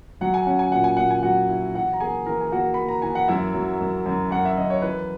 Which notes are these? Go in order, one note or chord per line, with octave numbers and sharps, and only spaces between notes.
F#3 F#5
G#5
C#4 F#5
G#5
A#2 F#5
G#5
A#2 F#5
G#5
F#3 F#4 F#5
E4
E3 F#4 F#5
A#5
A#3 G#4 G#5
E3 A#4 A#5
G#5
A#3 F#4 F#5
A#3 B5
A#5
E3 G#5
F#5
F#2 E4 E5
F#3
F#2
F#2
F#2 F#5
E5
F#2 D#5
C#5
E3 B4